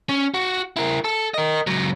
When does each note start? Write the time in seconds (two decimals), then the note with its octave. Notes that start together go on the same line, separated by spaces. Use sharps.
0.09 C#4
0.34 F#4
0.77 E4 A#4
1.05 A4
1.34 A#4 D#5
1.67 C#2 F#3